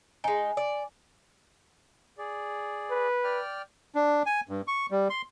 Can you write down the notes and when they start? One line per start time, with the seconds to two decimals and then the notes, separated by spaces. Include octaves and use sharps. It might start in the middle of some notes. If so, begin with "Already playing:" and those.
0.24 G#3 D#4 G#5
0.57 D5
2.18 G#4 D5
2.90 B4
3.24 D5 G5 F6
3.95 D4
4.26 G#5
4.49 G2
4.67 C#6
4.91 G3
5.10 C6